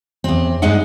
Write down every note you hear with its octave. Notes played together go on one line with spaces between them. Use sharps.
E2 C4
G2 G#3 D#4 D#5 F#5